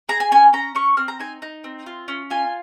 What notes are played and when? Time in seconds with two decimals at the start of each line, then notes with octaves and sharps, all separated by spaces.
0.09 G#4 A#5
0.20 G#5
0.31 C#4 G#5
0.53 C#4 A#5
0.75 C#4 C#6
0.97 C4 F6
1.08 A#5
1.20 D#4 G#5
1.42 D#4
1.64 C4
1.86 F4
2.08 C#4
2.30 F4 G#5